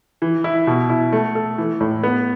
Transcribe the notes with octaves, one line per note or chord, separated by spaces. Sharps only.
E3
E4
B2
E4
A3
A4
E3
A2
B3